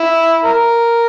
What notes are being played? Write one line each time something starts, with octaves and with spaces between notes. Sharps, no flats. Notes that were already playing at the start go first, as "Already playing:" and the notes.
Already playing: E4
A#4